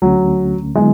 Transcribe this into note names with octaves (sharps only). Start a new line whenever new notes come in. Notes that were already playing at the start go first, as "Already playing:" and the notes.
D2 D3 F#3 A3 C#4
D3 F#3 G#3 B3 E4